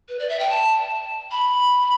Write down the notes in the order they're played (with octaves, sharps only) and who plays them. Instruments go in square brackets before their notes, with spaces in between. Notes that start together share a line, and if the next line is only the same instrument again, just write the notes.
[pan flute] B4
D5
E5
G5
A5
B5